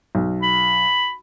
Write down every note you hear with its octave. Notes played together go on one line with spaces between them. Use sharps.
B1
B5